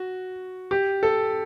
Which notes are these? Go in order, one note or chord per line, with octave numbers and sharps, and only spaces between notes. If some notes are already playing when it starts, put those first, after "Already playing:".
Already playing: F#4
G4
A4